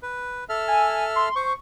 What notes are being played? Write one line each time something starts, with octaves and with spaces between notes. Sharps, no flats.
B4
A4 E5 F6
G#5
C6
C5 C#6